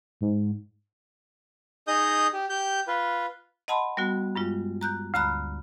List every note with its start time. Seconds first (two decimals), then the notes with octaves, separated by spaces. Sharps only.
0.21 G#2
1.88 D#4 G#4 D#5 D#6 G6
2.33 G4
2.50 G4 G6
2.88 F4 B4
3.68 D#5 F#5 A5 B5 C6
3.97 G3 B3 F#4
4.36 G2 G#3 F4
4.81 A#5 F#6 G6
5.14 D2 D3 A#5 B5 F#6